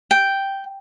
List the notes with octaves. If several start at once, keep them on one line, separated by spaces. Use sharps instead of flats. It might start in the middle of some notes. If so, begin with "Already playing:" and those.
G5